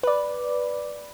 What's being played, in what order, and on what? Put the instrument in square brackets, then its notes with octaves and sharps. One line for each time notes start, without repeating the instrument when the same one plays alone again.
[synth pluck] B4 D5